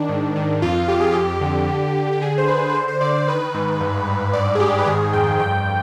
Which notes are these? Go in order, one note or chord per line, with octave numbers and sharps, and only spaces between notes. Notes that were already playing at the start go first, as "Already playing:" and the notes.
Already playing: D#3 D4
G#2
D#3
F2 F4
F2 G4
G#4
F2 G4
D3
D3
D3
G4
D3 G#4
C5
D3 B4
B4
D3 C5
C5
D3 D5
C5
D#3 B4
G#2
G2
G2
G#2 D5
G#4
G#2 G4
B4
D#3 G#4
F2 G5
G2 G5